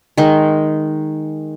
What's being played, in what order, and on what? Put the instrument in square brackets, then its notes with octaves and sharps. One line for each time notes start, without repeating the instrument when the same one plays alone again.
[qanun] D#3 G#3